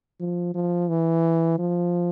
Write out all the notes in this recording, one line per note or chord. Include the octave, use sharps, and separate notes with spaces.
F3
F3
E3
F3